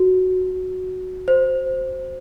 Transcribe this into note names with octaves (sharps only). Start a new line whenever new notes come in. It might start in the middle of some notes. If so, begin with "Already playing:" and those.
Already playing: F#4
C5